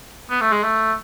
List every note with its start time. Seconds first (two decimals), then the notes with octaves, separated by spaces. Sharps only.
0.30 B3
0.41 A3
0.52 G#3
0.63 A3